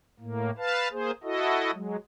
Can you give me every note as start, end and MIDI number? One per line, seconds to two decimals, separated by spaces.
0.20 0.51 45
0.20 0.51 58
0.58 0.88 71
0.58 0.88 77
0.58 0.88 81
0.92 1.11 58
0.92 1.11 68
0.92 1.11 72
1.23 1.71 64
1.23 1.71 66
1.23 1.71 69
1.23 1.71 75
1.73 1.96 54
1.73 1.96 56